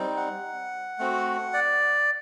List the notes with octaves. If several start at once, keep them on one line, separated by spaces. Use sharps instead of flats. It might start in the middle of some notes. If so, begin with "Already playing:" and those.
Already playing: G3 C4 D#4
F#5
A3 C4 F#4
D5